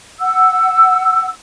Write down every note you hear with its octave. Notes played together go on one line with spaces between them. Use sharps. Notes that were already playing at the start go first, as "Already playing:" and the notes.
F#5 E6